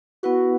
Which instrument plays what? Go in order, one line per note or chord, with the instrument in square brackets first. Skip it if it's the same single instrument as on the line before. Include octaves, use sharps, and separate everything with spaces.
[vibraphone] B3 E4 B4 F#5 [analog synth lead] F#4